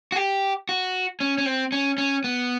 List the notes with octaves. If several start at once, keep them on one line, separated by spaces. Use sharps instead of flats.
F#4
G4
F#4
C#4
C#4
C4
C#4
C#4
B3